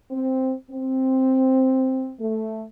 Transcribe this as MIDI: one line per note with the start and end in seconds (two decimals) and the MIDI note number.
0.11 0.53 60
0.70 2.10 60
2.20 2.64 57